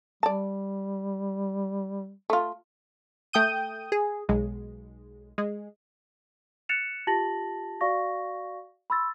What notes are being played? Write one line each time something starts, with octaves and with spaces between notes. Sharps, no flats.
G3 D5 A5
A3 F4
A3 G5 D#6 G6 D#7
G#4
B1 G#3
G#3
F#6 A6 C#7 E7 F7
F4 G4 A5 A6 A#6 F#7
F#4 D5 F5 C#6 A#6
B5 C6 E6 A6